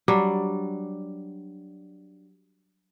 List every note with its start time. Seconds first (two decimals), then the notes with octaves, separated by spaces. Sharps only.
0.08 F#3 G3 D4